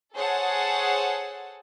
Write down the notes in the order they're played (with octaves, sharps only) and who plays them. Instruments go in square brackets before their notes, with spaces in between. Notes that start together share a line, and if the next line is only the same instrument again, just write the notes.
[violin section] G#4 A4 C5 C#5 F#5 A5